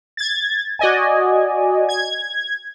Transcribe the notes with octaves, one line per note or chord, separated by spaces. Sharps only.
G#6 A6
F#4 D5 D#5 G#5
G#6